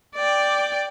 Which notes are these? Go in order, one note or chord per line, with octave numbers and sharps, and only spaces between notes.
D5 G5